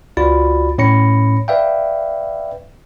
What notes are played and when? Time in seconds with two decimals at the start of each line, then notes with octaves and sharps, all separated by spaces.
0.17 C#2 F4 F#4 D5 B5 A6
0.78 A2 C#4 C#5 B5 A#6 C#7
1.48 B4 D5 E5 F5 G5